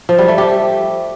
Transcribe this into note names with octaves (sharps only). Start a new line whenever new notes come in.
F3
G3
A3
G4